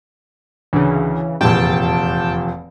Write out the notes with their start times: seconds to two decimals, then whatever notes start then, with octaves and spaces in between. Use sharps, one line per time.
0.73 D2 C#3 E3
1.41 F1 E2 A#2 G5 A5